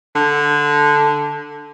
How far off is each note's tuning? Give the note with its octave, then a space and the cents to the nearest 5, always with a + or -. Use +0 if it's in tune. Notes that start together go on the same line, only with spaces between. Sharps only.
D3 -5